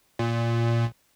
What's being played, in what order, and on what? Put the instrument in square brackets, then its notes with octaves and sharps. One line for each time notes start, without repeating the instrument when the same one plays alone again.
[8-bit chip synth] A#2